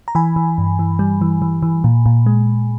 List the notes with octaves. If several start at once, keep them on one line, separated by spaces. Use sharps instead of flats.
A#5
E3 G#5 B5
E3
G2
E3
G3
E3
E3
E3
A#2
A#2
G#3